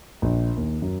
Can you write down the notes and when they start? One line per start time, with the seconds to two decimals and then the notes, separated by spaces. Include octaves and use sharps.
0.22 A#1
0.56 D#2
0.82 F#2